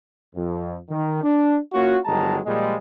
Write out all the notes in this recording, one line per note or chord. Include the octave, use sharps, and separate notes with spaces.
F2
D#3
D4
A#3 C#4 F4 F#4
G1 D#3 F#3 G#3 A5 A#5
A#2 F3 G3 G#3